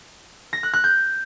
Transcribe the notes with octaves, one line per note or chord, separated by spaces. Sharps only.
A#6
F#6
F#6
G6